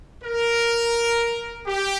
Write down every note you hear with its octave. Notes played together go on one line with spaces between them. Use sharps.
A#4
G4